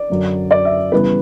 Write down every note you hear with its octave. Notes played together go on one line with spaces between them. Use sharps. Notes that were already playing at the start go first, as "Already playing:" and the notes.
Already playing: D5
F#2 D3 F#3
D5
E5
C#3 E3 G3 B3 B4